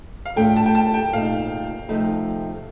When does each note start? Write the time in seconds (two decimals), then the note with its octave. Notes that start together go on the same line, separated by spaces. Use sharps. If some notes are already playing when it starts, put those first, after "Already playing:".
0.25 F5
0.36 A2 A3 D4 F4 A4 G5
0.56 A5
0.66 G5
0.75 A5
0.94 G5
1.13 A#2 A3 D#4 F5
1.89 C3 F3 A3 D#4 A4